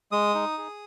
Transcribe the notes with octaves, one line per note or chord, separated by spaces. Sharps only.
G#3 D#6
D#4
G#4